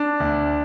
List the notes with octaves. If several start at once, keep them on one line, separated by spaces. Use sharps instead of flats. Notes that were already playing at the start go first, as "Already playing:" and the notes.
Already playing: D4
D2